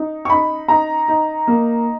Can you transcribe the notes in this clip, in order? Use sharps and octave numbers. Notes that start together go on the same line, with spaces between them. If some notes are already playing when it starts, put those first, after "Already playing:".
Already playing: D#4
C#6
D#4 B5
D#4 A#5
D#4
A#3